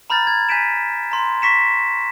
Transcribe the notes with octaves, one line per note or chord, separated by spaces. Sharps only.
A#5 B5 F6 G6 A6
G#6 A6
G#5 G6 G#6 B6 D7 E7
A#5 C6
C#6 A#6 B6 C#7 E7